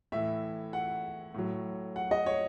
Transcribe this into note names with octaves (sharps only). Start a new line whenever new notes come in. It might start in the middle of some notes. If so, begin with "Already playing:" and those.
A2 E3 E5
F#5
A2 F#3
F#5
D#5
C#5